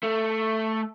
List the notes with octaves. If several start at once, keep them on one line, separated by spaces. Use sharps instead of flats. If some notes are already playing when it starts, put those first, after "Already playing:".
A3